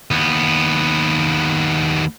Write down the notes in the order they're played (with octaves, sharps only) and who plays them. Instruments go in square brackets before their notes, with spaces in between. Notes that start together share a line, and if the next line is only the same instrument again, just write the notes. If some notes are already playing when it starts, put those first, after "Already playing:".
[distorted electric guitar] D#2 B3